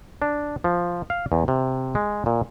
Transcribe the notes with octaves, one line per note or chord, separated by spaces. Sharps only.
D4
F3
F5
E2
C3
G#3
A#2